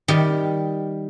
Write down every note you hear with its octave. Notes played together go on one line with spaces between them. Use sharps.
D#3 G3 G4